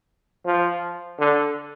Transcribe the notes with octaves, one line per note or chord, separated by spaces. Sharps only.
F3
D3